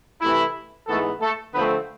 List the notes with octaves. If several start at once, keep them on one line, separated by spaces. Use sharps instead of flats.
C3 E3 A3 E4
G#2 E3 A3 B3 A4
A3 A4
D3 F3 A3 B3 C4 B4